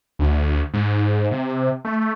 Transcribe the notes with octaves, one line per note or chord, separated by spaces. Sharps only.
D2
G#2
C3
A3